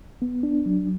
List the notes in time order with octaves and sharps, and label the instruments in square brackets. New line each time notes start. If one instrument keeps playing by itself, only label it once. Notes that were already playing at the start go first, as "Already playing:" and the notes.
[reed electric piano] B3
D4
F#3